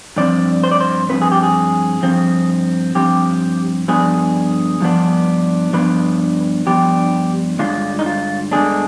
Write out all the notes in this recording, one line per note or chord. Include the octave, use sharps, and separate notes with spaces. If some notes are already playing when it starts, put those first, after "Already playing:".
G2 F3 C4 D5
C5
D5
C5
G2 F3 C4 B4
G#4
G4
G#4
G2 F3 C4
G2 F3 C4 G4
G2 F3 B3 D4 G#4
G2 F3 B3 D4
G2 F3 B3 D4 B4
G2 F3 B3 D4 G4
G2 D3 G#3 D4 F4
D#4
F4
G2 D3 G#3 B3 D4 G#4